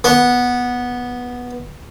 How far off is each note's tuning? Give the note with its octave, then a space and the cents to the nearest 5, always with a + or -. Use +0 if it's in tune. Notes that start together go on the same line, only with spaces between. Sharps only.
B3 -10